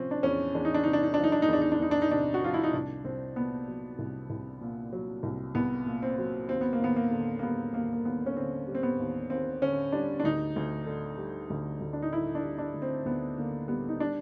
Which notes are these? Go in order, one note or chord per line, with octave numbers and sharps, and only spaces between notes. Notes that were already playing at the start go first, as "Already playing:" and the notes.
Already playing: C3 F3 C4 C#4
D4
E2 C#4
E2 D4
D#4
D4
C3 D#4
D4
D#4
F3 D4
D#4
D4
D#4
E2 D4
D#4
D4
E2 D#4
D4
D#4
C3 D4
F#4
F3 F4
E4
D#4
C2 D4
C2 C4
A#2 B3
F#3
C2
C2
A#2
F#3
C2
C2 B3
A#2
C4
F#3
D#2 C4
B3
A#3
D#2 B3
A#3
D3
A#3
G3 B3
D#2 A#3
A#3
D#2 B3
C#4
D3 C4
G3
C4
B3
D#2
D#2 C4
D3 C#4
G3 D4
D4
D2 D#4
D2
D3
G3
D2
D2
D4
D#4
D3 E4
D4
G3
D4
D2
C4
D2 B3
D3 A#3
G3 B3
D#4
G3 D4